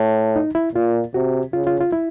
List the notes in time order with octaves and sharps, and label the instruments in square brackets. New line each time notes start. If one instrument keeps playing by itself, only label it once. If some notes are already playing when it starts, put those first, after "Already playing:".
Already playing: [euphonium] A2
[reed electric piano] D#4
E4
[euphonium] A#2 [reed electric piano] F4
[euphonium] C3 [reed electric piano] F#4
[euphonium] C#3 [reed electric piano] F4
[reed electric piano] F4
F4
E4